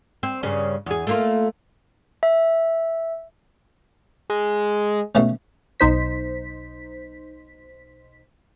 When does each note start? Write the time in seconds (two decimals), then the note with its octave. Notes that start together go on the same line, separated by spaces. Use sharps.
0.23 C4
0.43 G2 C#3 C#4
0.86 E2 G#4
1.07 A3 A#3 F4
2.23 E5
4.30 G#3
5.15 B2 A3 C#4
5.80 B1 D#4 C5 B6